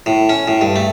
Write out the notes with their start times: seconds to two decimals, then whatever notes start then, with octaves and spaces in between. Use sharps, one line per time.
0.06 A2
0.29 C#4
0.48 A2
0.61 G2
0.76 A3